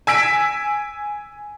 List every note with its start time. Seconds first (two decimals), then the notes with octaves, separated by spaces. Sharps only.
0.07 G#5 E6 B6 D7